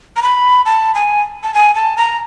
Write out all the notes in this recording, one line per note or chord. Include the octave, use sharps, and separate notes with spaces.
A#5
B5
A5
G#5
A5
G#5
A5
A#5